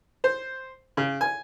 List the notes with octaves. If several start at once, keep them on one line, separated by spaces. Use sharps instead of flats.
C5
C#3
G#5